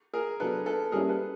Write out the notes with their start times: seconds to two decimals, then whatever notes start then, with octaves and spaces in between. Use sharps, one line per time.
0.14 G#4 A#4
0.40 F#3 B3 D4 A4 B4
0.66 A4 B4
0.92 G3 A#3 C#4 E4 G#4 A#4
1.09 A4 B4